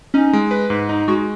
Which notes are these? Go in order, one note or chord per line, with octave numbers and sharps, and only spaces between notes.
C#4 D#4
G#3
B4
G#2
D#4
G#3 F#4